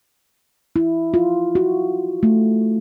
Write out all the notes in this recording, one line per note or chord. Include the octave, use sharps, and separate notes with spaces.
E4
F4
F#4
A3